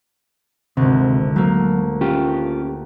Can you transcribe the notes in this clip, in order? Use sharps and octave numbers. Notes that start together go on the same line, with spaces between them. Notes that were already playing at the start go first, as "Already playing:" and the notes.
G#1 D2 C3
F#3 A3 A#3
C#4 F4 G4